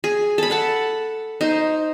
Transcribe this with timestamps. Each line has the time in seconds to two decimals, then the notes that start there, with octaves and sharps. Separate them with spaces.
0.04 G#4
0.38 A4 B5
0.50 A4 F#5 A5
1.41 D#4 C5